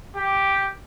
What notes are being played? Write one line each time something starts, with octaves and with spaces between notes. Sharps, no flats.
G4